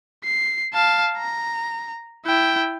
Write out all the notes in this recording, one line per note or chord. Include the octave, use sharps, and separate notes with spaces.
C7
F5 A5
A#5
E4 G5